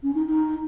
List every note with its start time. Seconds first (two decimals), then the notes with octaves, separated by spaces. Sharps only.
0.03 C#4
0.14 D#4
0.26 D#4